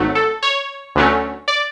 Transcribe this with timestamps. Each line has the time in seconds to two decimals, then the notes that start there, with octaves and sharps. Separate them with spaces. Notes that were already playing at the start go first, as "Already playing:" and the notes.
Already playing: G#1 G#2 F#3 A3
0.15 A4
0.43 C#5
0.96 D2 D3 F#3 A3 C#4
1.48 D5